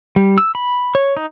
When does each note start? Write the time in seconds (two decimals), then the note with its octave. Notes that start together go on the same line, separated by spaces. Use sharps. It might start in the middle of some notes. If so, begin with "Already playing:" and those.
0.16 G3
0.38 E6
0.55 B5
0.95 C#5
1.17 D#4